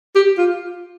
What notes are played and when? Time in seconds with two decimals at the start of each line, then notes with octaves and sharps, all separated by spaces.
0.15 G4
0.38 F4